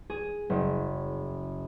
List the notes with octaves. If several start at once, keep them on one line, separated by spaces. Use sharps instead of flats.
G#4
F#1